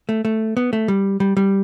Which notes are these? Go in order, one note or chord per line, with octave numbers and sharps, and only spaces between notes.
A3
A3
B3
A3
G3
G3
G3